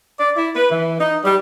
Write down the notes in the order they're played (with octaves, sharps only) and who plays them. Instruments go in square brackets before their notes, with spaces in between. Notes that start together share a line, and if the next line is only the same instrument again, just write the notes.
[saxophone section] D5
E4
B4
E3
D#4
G3